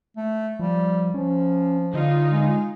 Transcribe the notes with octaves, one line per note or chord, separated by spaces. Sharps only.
A3
F3 G3
F3 C#4
D3 D#4 F4
G#3